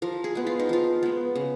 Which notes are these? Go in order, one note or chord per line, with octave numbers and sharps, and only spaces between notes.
F3 A#4
G#4
G#3 B3
F4
D#4
F3 F4
G#3 B3
C#3